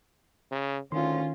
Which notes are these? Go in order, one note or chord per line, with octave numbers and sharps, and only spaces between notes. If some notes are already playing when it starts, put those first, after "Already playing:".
C#3
D2 D#3 C#4 F4 C6